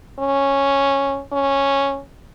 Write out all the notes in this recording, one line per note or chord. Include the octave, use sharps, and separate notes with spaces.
C#4
C#4